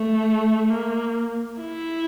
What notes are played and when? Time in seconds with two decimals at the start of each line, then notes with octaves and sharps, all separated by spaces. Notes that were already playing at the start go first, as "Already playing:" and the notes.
Already playing: A3
0.70 A#3
1.61 E4